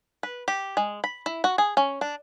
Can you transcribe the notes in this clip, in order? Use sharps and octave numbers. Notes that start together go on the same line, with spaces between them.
B4
G4
G#3
B5
E4
F#4
G#4
C#4
D4